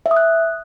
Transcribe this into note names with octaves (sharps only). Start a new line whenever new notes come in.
E5
D#6
F#6